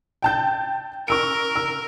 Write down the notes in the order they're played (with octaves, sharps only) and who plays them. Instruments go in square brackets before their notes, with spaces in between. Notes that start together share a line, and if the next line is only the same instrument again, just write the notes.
[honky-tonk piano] G5 A5 G6
[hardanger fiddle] A#4 [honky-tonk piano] C#6 E6 D7
[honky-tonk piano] E6